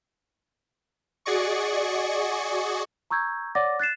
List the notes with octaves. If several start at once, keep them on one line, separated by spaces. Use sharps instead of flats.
F#4 G#4 D5 D#5 C#6
A#5 C#6 E6 G6 G#6
C#5 D5 F#5 D6 A6 A#6
F#6 A6 C7 E7